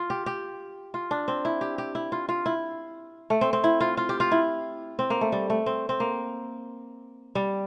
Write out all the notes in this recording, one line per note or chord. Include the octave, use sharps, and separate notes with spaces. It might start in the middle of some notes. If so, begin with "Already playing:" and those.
Already playing: F4
G4
G4
F4
D4
C4
E4
G4
G4
E4
F4
F4
E4
A3
C4
C4
E4
F4
F4
G4
F4
E4
C4
A#3
A3
G3
A3
C4
C4
A#3
G3